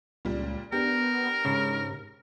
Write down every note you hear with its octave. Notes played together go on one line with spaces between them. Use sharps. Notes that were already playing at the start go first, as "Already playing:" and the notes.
C#2 A#2 G3
B3 D4 G4 A#4
G#2 C#3